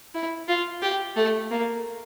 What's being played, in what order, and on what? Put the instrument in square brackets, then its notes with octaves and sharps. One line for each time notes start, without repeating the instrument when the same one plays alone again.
[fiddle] E4
F4
G4
A3
A#3